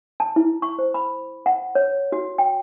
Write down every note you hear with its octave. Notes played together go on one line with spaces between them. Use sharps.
A5
E4
C#6
C5
B5
F#5
C#5
F#4
G5